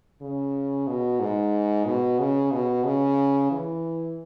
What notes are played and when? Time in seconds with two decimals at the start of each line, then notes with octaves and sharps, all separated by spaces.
0.21 C#3
0.88 B2
1.20 G#2
1.86 B2
2.19 C#3
2.51 B2
2.85 C#3
3.51 E3